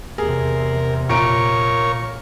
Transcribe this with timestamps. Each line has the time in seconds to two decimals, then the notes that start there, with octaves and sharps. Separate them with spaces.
0.18 E2 C3 G#4 A#4
1.09 A#2 A#4 C#5 A#5 C#6 D7